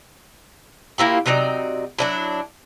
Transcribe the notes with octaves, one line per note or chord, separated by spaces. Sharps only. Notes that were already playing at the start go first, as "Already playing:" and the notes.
A#2 A#3 E4 G4
C3 F#3 D#4 D5
F#3 D4 E4